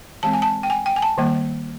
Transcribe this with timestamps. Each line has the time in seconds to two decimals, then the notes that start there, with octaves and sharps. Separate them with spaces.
0.23 E3 G#3 C4 A5
0.33 G#5
0.42 A5
0.63 G5
0.70 G#5
0.86 G5
0.96 G#5
1.02 A5
1.18 D#3 G3 A#3